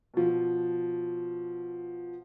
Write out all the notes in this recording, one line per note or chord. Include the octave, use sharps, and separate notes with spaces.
B2 F3